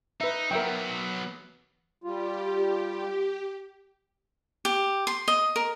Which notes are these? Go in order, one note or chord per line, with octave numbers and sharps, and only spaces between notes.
D#4 B4 E5
F#3 B3 A#4 E5 G5
G3 F4 G4
G4
C6
D#5
A#4